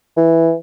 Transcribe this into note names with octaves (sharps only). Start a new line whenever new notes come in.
E3